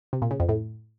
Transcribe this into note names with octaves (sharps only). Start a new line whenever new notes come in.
C3
A#2
C#3
F2
A2